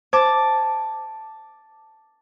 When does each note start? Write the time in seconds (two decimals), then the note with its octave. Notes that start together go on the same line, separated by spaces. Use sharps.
0.13 C5 A5 D6